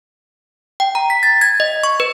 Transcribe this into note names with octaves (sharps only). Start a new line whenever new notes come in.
G5
A#5
B6
A6
G#6
D#5
C#6
B4